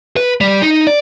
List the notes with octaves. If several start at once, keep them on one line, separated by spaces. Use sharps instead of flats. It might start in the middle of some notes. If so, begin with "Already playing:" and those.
B4
G3
D#4
D5